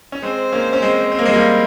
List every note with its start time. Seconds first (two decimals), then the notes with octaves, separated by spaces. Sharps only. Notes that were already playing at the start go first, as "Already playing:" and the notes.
0.12 C#4
0.22 G#3 C4 C5
0.52 A#3 C#4
0.73 C#4
0.82 G#3 C4
1.12 C4
1.19 A#3
1.25 G#3 C4
1.33 G3 A#3